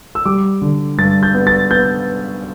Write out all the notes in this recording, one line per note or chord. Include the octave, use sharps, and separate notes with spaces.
E6
G3 D6
D3
G2 A6
G6
B3
A6
B3 G6